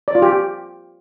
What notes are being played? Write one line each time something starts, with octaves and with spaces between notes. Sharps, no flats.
D5
F4
G4